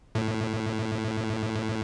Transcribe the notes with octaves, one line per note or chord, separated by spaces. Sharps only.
A2